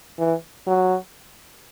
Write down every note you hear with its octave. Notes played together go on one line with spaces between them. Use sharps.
E3
F#3